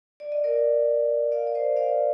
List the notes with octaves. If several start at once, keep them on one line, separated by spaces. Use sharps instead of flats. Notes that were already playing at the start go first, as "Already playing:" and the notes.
D5
D#5
A#4 D5
D5 F5
D5
C5 D#5
D5 F5